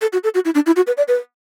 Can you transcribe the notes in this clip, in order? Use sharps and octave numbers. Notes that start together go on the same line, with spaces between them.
A4
F#4
A4
F#4
E4
D4
E4
F#4
B4
D5
B4